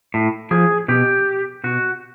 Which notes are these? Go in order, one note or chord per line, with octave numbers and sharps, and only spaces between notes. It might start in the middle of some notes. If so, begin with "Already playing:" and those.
A2
F3 G#4
B2 G4
B2 F#4